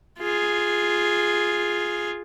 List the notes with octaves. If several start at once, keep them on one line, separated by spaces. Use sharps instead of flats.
F4 G#4